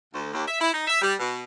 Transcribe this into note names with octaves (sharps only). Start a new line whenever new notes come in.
D2
D#2
E5
E4
D#4
E5
G3
B2